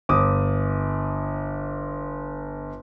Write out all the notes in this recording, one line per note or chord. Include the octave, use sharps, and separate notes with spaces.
G1 D6 D#6